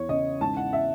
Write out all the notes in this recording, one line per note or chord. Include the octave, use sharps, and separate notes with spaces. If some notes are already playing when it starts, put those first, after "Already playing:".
Already playing: E2 C#5
C#3 D#5
G#1 A5
F#5
E5